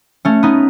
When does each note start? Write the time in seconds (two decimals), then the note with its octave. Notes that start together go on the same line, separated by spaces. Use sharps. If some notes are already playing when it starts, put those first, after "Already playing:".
0.25 A3 C#4
0.43 B3 D#4